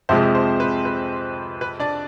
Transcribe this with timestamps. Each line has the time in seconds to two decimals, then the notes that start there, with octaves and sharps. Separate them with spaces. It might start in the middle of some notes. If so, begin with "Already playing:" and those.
0.09 F2 C3 F3 G#3 C5
0.35 C5
0.60 B4
0.85 B4
1.61 B4
1.80 D4 D5